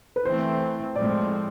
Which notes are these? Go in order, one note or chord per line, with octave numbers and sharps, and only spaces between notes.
B4
E3 A3 C4 C5
A2 F3 G#3 C4 D5